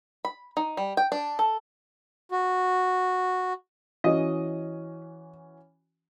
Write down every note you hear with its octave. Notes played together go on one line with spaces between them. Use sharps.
B5
D#4
G3
G5
D4
A4
F#4
E3 C#4 F#4 D#5